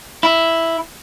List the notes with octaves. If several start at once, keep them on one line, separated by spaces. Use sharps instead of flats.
E4